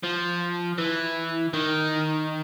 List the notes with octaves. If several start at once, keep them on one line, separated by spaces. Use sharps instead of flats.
F3
E3
D#3